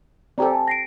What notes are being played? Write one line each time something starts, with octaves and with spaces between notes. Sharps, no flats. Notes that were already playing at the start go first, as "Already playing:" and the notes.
C4 G4 A4 D5 A#5
G#5 A5
A#6 C7 D7